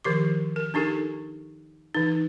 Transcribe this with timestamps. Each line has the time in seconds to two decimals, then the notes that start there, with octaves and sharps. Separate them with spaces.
0.04 D#3 F3 G4 D6
0.56 A#4
0.74 D4 D#4 G4 A4 A#4
1.94 E3 D#4